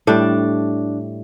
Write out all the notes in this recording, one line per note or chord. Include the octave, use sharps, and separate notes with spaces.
A2 G3 D4